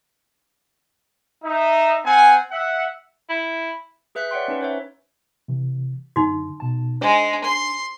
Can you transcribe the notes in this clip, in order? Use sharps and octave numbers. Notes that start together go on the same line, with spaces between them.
D#4 E5
C4 F#5 G#5
E5 F#5
E4
G#4 B4 E5 F#6 G6 B6
C#5 D5 F#5 G5 C6
C#4 D#4 B4
C5 C#5 E5
C3 E3
F#2 D3 D#4 F#4
B2 A5
G#3 D4 C5 G#5
C6